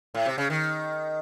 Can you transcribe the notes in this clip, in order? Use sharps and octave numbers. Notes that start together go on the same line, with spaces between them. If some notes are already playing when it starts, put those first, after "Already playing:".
A2
C3
C#3
D#3